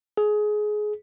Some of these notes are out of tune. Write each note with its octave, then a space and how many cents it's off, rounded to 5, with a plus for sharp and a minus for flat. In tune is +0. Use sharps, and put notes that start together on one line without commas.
G#4 +20